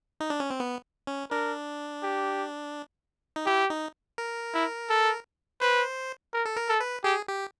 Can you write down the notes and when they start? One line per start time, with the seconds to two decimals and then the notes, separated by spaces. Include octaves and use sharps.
0.20 D#4
0.30 D4
0.40 C#4
0.50 C4
0.60 B3
1.07 C#4
1.31 D4 A#4
2.03 G4
3.36 D#4
3.46 E4 G4
3.70 D#4
4.18 A#4
4.54 E4
4.90 A4
5.61 B4 C5
6.33 A#4
6.46 A4
6.56 A#4
6.69 A4
6.80 B4
7.04 G4 G#4
7.28 G4